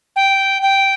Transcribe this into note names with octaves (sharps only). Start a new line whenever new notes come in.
G5
G5